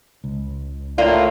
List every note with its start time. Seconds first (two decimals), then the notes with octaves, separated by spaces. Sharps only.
0.24 C#2
0.98 A2 A#3 F4 D5